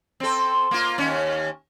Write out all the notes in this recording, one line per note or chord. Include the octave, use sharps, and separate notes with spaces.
C4 A4
A#3 F4
D#2 C#4